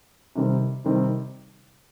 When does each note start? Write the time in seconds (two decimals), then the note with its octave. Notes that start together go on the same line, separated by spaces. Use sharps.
0.35 C3 D#3 G3 C4
0.85 C3 D#3 G3 C4